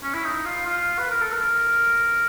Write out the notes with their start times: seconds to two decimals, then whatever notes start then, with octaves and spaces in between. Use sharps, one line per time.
0.03 C#4
0.14 E4
0.24 D#4
0.45 F4
0.66 F4
0.98 B4
1.10 A#4
1.21 A4
1.32 A#4